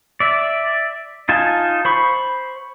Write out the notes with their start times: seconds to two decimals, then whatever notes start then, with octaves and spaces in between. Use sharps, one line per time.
0.20 D5 E5
1.29 D#4 F4 G#5 A5
1.85 C5 B5 C#6